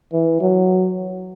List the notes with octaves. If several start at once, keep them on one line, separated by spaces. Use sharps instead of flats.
E3
F#3